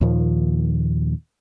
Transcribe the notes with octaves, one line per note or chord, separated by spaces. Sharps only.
D#2 A#2 D#3 F3